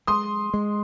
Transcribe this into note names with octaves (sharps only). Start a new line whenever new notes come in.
G#3 C6 D#6
G#3